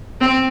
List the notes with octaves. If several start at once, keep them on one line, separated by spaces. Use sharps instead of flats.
C4